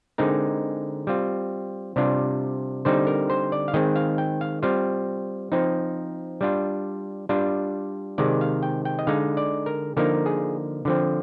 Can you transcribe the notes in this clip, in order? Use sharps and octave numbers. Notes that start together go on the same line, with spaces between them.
D3 G#3 C4 D#4 A#4
G3 C4 F4
C3 G3 D4 F4
D3 G3 C4 D#4 C5
A#4
C5
D5
F5
D#3 G#3 C4 D#5
F5
G5
F5
G3 C4 F4 F5
F3 C4 D#4
G3 D4 F4
G3 D4 F4
C3 D#3 G#3 D5
F5
G5
G5
D#5
D3 G#3 D#4 F5
D5
A#4
D3 F3 A#3 D#4 A#4
G#4
D3 F3 C4